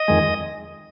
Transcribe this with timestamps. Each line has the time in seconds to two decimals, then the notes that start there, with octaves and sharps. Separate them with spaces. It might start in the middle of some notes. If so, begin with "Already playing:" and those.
Already playing: D#5
0.08 F2 D#3 G#3